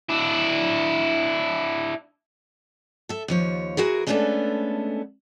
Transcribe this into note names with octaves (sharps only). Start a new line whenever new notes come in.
D4 E4
A4 E5
D#2 F3 C#5
E3 F#4 G#4 A#4
G#3 A3 B3 C#4 D4 A4